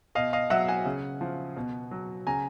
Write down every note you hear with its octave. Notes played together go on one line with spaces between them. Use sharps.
B2 D#5 F5
D#5 F5
F#3 E5 F#5
F#5 G#5
C#3
F3
B2
F#3
C#3 G#5 A#5